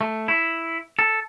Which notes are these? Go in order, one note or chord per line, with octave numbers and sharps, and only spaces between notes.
A3
E4
A4